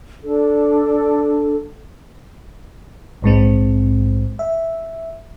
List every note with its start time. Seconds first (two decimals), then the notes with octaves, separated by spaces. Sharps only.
0.24 D4 A4
3.22 A#1 G#2 G#3 C4
4.39 E5